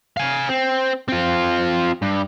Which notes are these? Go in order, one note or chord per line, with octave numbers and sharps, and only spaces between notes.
F5 G#5
C4
C4 F4
G2